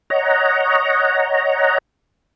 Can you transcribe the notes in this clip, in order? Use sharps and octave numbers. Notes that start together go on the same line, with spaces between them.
C#5 D#5 F#5 A#5